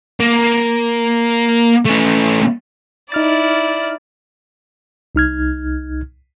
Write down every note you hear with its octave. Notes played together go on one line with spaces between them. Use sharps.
A#3
A3 C#4
D#4 E4 D5 F6 A6
C2 D#4 F6 G#6